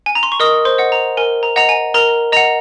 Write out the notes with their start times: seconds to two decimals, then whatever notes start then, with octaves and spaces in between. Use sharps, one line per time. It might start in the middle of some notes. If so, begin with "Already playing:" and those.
0.06 G#5
0.15 A#5
0.23 C6
0.32 C#6
0.40 A#4 D#5 D#6
0.65 C5 C6
0.78 D#5 F#5
0.92 A#5
1.17 A#4 G#5
1.43 A#5
1.56 D#5 F#5 A#5
1.69 G#5
1.94 A#4 A#5
2.32 D#5 F#5 A#5